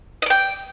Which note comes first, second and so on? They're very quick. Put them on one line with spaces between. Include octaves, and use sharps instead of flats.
D#5 D5 G5